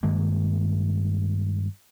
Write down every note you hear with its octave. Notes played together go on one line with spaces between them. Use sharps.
G2 D#3 G#3 A#3